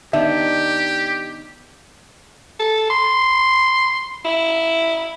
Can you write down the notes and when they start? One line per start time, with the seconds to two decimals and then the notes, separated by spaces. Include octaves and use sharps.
0.13 D#3 B3 D4 G4 E5
2.59 A4
2.90 C6
4.25 E4